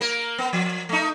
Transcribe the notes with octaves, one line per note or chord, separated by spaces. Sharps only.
A#3 A#4
B3
F3
A3 D#4